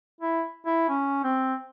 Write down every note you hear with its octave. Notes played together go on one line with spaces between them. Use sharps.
E4
E4
C#4
C4